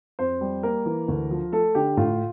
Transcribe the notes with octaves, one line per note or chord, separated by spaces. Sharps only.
F2 C5
G3
A#3 A#4
E3
D2
F3
A3 A4
D3 G4
A2 F4